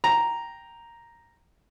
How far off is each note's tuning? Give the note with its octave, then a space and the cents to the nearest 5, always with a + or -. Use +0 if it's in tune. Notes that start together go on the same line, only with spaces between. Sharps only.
G5 +0 A#5 +0